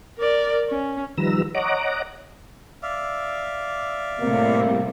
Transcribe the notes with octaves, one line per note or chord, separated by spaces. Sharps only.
A#4 D5
C#4
D#3 F3 G3 B4 A#5 E6
C#5 D#5 F#5 A#5 D6
D5 E5 F5
A2 C3 G3 A#3